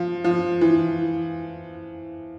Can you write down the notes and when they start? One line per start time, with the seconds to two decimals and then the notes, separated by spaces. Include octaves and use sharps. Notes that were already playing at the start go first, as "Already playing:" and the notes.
Already playing: F3
0.24 F3
0.61 E3